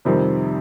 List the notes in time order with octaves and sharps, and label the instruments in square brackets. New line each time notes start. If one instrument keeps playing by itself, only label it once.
[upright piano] F2 C3 D#3 G3 C4